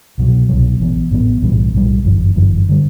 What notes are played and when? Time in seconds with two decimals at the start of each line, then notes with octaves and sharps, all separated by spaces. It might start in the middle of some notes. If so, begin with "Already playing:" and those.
0.18 C2 B2 F#3
0.49 C2 B2 F#3
0.80 A1 A2 E3 B3
1.11 A1 A2 E3 B3
1.42 B1 A2 E3 G3
1.73 B1 A2 E3 G3
2.04 G1 F#2 E3
2.36 G1 F#2 E3
2.69 D3 G3